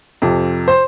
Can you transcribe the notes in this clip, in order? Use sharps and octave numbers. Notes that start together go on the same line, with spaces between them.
F2 C3 F3
C5